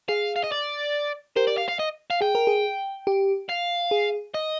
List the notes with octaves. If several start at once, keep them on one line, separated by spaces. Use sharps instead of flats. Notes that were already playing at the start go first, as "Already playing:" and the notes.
G#4 F5
F5
D#5
D5
G4 A#4 C5
D5
F5
F5
D#5
F5
G#4 G5
A#4
G#4
G4
F5
G#4
D#5